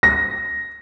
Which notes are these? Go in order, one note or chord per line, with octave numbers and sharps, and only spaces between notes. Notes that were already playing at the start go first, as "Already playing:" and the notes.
A#6